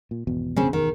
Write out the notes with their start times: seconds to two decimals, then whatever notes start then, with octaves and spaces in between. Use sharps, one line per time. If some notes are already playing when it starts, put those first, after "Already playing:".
0.11 A#2
0.27 G#1 E2 B2
0.56 C#3 C4 C#4
0.73 D#3